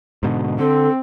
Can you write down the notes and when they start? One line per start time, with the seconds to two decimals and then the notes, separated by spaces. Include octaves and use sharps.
0.23 G#2 B2 D3
0.59 D3 C4 A4